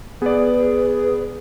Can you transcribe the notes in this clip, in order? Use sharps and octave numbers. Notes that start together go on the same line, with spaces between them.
B3 G#4 B4 D5